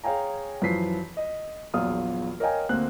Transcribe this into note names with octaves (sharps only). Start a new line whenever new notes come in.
G#4 C#5 F5 G5 G#5 A#5
F#2 E3 F3 B6 C7
D#5
A#1 E2 F#3 F4 D#6 F6
A#4 C#5 D#5 F5 G5 G#5
D2 A#3 C4 F#6